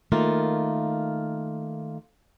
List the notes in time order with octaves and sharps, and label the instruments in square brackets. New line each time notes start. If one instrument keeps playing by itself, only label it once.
[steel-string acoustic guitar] D#3 A3 A#3 F4